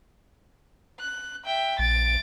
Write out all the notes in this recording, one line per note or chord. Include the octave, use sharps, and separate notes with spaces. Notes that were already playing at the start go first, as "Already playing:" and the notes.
F#6
E5 G5
A#1 A6 D7